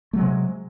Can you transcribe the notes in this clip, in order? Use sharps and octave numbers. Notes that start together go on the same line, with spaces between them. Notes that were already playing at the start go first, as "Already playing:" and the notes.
C3 F#3 G#3 A3